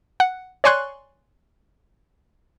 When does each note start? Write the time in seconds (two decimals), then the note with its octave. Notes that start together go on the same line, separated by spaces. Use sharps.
0.20 F#5
0.64 C#5 D5 G#5 C6 C#6 F#6